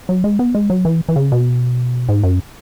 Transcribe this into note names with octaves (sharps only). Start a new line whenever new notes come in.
F#3
G#3
B3
G#3
F#3
E3
E3
C#3
B2
G#2
F#2